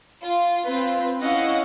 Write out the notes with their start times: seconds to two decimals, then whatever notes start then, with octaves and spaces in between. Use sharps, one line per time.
0.22 F4
0.64 C4 F4 B4
1.22 C#4 E4 D#5 F5 F#5